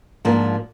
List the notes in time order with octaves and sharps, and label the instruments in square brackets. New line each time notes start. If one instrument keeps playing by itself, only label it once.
[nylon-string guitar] G#2 F3 A#3 D4 F4